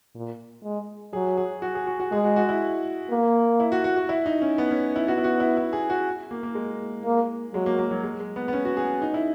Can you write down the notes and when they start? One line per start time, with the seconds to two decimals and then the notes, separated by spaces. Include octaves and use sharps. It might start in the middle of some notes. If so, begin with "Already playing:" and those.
0.15 A#2
0.64 G#3
1.13 F#3 G#4
1.37 G#4
1.62 F#4
1.75 G#4
1.87 F#4
2.00 F#4
2.12 G#3 G#4
2.24 F#4
2.36 F#4
2.49 E4
3.10 A#3
3.60 E4
3.72 F#4
3.84 F#4
3.96 F#4
4.09 E4
4.26 D#4
4.42 C#4
4.58 B3
4.71 C#4
4.96 E4
5.07 B3 F#4
5.18 E4
5.24 F#4
5.40 E4
5.57 E4
5.73 G#4
5.90 F#4
6.31 A#3
6.43 A#3
6.55 G#3
7.05 A#3
7.54 F#3 G#3
7.66 A#3
7.79 A#3
7.91 F#3
8.04 G#3
8.20 G#3
8.36 B3
8.48 B3
8.53 C#4
8.65 F#4
8.77 G#4
9.02 D#4
9.14 E4